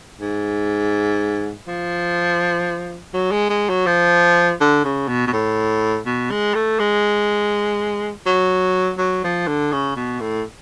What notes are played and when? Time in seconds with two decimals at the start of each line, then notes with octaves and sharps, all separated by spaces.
0.21 G#2
1.67 F3
3.14 F#3
3.31 G#3
3.50 G#3
3.69 F#3
3.86 F3
4.60 D3
4.84 C#3
5.08 B2
5.27 B2
5.32 A2
6.06 B2
6.31 G#3
6.54 A3
6.79 G#3
8.26 F#3
8.98 F#3
9.24 F3
9.47 D3
9.72 C#3
9.96 B2
10.20 A2